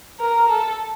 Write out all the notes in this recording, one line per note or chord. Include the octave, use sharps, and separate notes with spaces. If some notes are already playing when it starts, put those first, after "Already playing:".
A#4
A4